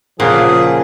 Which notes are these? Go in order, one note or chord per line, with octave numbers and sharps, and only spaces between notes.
A#2 C#3 F3 G#4 F#5